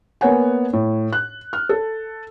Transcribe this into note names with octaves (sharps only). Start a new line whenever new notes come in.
A#3 B3 A#4 C#5 F#5 G#5
A2
F#6
F6
A4